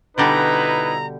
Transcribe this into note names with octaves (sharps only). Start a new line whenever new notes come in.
B2 D3 G3 D#4 E4 B4 A#5